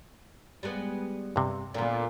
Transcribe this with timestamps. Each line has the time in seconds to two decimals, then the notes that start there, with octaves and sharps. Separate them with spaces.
0.63 G3 G#3 B3
1.36 G2 C3
1.74 A#2 D3 B3